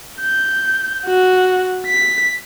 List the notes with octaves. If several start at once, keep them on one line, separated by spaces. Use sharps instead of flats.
G6
F#4
B6